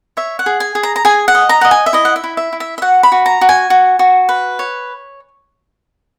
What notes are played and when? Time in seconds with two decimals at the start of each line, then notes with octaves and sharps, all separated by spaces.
0.17 C#5 E5
0.39 F#5
0.46 G#4
0.60 G#5
0.75 G#4
0.83 A#5
0.96 A#5
1.05 G#4 G#5
1.28 F#5
1.35 D#5
1.49 A#5
1.61 D#5 F#5
1.71 G#5
1.86 E5
1.93 E4 D#5
2.05 F#5
2.16 E5
2.24 E4
2.37 E5
2.53 E4
2.60 E5
2.78 E5
2.82 F#4 F#5
3.03 B5
3.12 F#4
3.26 A#5
3.41 F#4
3.49 G#5
3.70 F#4
3.99 F#4
4.29 B4
4.59 C#5